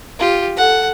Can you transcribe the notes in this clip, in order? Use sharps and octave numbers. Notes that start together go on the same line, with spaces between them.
F4 G4
A4 F#5